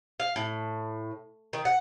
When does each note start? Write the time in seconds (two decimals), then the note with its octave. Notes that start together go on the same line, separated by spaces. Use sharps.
0.20 F5
0.36 A2
1.53 D#3
1.65 F#5